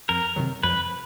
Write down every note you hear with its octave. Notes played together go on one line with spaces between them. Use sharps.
F2 A#4
C3 D#3 F#3
F2 B4